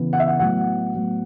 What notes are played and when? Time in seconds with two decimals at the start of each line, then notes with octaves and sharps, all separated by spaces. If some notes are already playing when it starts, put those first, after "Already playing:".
Already playing: C#3 E3 B3
0.13 F#5
0.20 E5
0.28 F#5
0.39 A2 F#3 B3 F#5
0.94 A2 F#3 B3